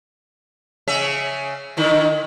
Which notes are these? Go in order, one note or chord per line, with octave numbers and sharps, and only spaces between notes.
C#3 C#4 E5
D3 D#3 E4